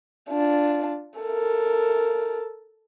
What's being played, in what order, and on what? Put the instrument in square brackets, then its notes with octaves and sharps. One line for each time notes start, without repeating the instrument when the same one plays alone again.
[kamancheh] D4 F4
A4 A#4